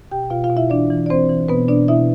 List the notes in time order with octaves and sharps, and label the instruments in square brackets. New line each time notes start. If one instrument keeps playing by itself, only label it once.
[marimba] B2 G4 G5
B2 F4 F5
F4 F5
B2
E4 E5
E3 D4 D5
E3
D5
E3 C4 C5
E3
B2 B3 B4
B2 D4 D5
B2 E4 E5